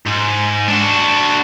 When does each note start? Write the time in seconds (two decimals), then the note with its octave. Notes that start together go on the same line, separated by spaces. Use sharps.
0.06 G#2
0.68 D4 F#4